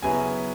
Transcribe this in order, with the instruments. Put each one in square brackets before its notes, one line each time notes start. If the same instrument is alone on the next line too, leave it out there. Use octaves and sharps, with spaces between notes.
[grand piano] F#2 C#3 F#3 B3 E4 G#5